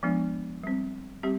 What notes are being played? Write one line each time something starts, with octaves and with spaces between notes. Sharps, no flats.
F3 G#3 B3 D4
G3 C4
G3 C4 G4